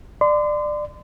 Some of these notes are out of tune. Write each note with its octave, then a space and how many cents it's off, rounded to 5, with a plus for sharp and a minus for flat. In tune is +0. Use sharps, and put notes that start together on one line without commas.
D5 +20 C6 -35